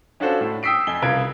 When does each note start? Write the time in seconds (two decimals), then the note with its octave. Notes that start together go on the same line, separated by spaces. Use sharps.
0.20 C#4 D4 F4 F#4 A4 C5
0.41 A2
0.63 G5 D#6 E6 B6 C7 D7
0.87 F2 G#5 G7
1.02 C2 C#3 F4 B4 G#6 D7